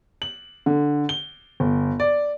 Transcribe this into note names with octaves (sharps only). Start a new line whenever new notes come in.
F#7
D3
G7
G1
D5